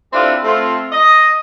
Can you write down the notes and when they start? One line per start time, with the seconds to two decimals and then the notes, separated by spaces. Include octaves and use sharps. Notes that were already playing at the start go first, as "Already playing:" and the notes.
0.13 C4 D4 E4 F4 G4 A4
0.44 A3 C4 F4
0.92 D#5